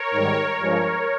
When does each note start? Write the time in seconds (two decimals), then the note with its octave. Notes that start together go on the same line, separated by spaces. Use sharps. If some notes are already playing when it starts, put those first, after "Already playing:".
Already playing: A#4 C#5
0.11 G#2 D#3 G3
0.58 G2 F3 G#3